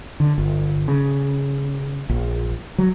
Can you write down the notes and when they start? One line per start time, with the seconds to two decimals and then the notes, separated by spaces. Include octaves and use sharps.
0.20 D3
0.38 G1
0.88 C#3
2.09 A#1
2.78 F#3